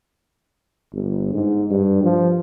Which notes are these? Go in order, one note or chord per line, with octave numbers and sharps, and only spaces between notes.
G1
G#2
G2
F3